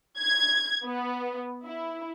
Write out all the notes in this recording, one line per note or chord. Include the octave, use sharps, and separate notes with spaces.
G#6
B3
E4